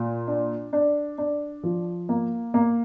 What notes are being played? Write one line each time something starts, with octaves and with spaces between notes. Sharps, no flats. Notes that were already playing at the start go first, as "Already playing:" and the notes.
Already playing: A#2
D4
D4
D4
F3
A#3
A#3